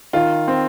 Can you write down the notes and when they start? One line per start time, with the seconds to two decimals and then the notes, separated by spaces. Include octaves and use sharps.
0.13 D#3 F4
0.48 C4